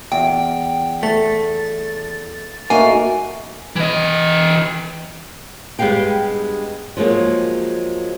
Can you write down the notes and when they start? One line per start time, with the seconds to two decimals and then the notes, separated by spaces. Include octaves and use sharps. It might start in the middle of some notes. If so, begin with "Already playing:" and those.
0.12 E2 G5
1.03 A3 A6
2.70 A3 A#3 D#4 F#4 G#5
3.76 E3 D#5
5.79 G2 G#3 B3 G4 F5 G5
6.97 F3 F#3 G#3 A#3 G#4